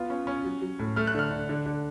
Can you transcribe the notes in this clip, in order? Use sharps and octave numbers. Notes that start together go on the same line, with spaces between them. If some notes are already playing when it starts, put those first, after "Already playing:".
Already playing: B3 F4
C#4
C#4
F#3
F#3
A2
A3 F6
F#6
D3 F6
D3
D3
D3